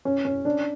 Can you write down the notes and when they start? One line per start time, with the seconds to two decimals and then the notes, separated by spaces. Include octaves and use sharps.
0.05 C#4
0.25 C#4
0.45 D4